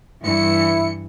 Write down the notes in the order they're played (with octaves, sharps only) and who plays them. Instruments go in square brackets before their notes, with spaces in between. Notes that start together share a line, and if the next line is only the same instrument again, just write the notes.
[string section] G2 E3 C#7 [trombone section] E4